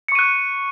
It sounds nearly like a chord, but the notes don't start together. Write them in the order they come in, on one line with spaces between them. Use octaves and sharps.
C#7 C#6 D#7 F#6